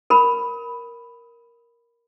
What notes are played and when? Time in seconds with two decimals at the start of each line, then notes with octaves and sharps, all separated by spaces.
0.10 A#4 B5